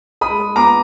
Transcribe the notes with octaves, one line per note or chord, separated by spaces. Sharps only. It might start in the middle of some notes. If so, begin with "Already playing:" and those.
G#3 B5 D#6
G#3
B3 A#5 D6